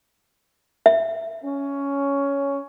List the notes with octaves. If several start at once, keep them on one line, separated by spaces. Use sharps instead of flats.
E5
C#4